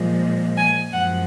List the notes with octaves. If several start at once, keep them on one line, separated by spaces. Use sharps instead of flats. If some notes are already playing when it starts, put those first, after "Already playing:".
Already playing: A#2 F3 G#3
G#5
F#2 F3 G#3 F#5